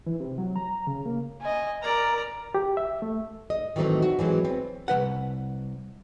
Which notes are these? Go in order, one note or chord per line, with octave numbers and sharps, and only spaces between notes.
E3
C3
F#3
A#5
C#3
A#3
D#5 G#5
A#4 D5 A#5
G4
E5
A3
D#5
D#3 E3 F#3 A3 C4 D#4
F#4
E3 F#3 G#3 C4
B3 C4
C2 D#3 B4 F#5